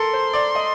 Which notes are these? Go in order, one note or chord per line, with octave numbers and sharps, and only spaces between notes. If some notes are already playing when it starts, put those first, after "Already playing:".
Already playing: A4 A#4 C6
C5
D5
D#5